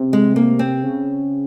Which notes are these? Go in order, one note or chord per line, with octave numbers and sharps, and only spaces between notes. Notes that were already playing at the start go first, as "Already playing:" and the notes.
Already playing: C3
G#3
A#3
C4
C#3